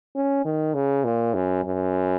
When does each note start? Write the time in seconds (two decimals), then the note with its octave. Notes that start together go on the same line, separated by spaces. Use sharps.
0.16 C#4
0.45 D#3
0.74 C#3
1.04 A#2
1.34 F#2
1.64 F#2